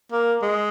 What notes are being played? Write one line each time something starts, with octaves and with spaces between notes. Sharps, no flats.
A#3
G#3